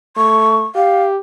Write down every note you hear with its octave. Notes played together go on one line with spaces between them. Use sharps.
A3 C#6
G4 F5